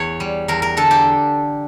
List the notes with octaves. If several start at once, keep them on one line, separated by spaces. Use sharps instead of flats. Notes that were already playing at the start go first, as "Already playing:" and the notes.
Already playing: E2 C#5
G3
E2 A#4
A#4
D3 A4
G4